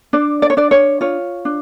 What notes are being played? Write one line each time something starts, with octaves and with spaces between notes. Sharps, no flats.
D4 D5
D5
C#5
D4 D5
C#5
F4 C#5
D4